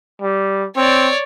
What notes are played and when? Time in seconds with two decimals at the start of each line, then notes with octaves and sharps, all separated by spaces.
0.21 G3
0.76 C4 C#5 D5